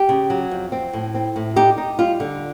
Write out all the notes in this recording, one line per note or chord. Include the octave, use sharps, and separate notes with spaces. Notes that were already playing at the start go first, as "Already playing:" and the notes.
Already playing: G4
C#3
F#3
F2
C4
A2
C4
A2
D#4 G4
D#4
G3 F4
D3